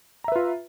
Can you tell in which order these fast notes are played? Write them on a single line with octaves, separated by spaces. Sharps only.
A#5 E5 B4 F4